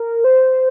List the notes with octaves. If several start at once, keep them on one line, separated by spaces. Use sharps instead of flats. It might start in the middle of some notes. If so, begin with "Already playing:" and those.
Already playing: A#4
C5